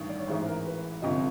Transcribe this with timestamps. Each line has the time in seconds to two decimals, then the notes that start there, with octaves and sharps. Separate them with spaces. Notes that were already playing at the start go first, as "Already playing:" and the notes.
Already playing: A1 G2 D#3
0.09 D5
0.18 C#5
0.28 A1 G#2 E3 G#3 C5
0.46 A#4
0.66 B4
1.02 G1 F2 C3 D#5